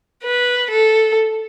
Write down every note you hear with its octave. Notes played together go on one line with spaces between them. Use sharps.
B4
A4